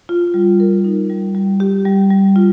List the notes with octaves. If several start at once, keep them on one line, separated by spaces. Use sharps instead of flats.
F4
G3
A#4
D#4
G3
G3
G4
G3
G3
F4